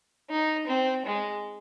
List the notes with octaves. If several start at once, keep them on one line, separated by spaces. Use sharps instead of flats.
D#4
C4
G#3